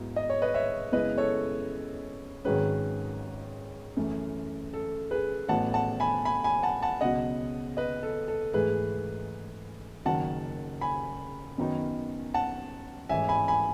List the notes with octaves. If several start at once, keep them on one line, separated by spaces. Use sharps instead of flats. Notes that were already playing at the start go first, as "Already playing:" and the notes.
Already playing: G#2 F#3 B3 E4
D#5
C#5
B4 D#5
C#5 E5
F#2 C#3 G#3 B3 E4 B4 D#5
A4 C#5
G#1 G#2 D#3 F#3 C#4 G#4 B4
F#2 E3 A3
A4
G#4 B4
A1 A2 F#3 B3 F#5 A5
F#5 A5
G#5 B5
G#5 B5
G#5 B5
F#5 A5
F#5 A5
C#2 B2 F#3 D#5 F#5
B4 D#5
A4
A4
G#2 E3 A3 G#4 B4
F#1 F#2 D#3 F#3 F#5 A5
G#5 B5
F#2 D#3 F#3 B3 D#4
F#5 A5
A1 G#2 E3 E5 G#5
G#5 B5
G#5 B5